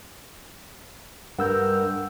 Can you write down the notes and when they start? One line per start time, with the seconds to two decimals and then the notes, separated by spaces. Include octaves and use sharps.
1.39 G2 A#4 F#5 E6 G6